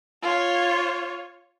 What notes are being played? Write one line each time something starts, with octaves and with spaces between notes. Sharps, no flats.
F4 C#5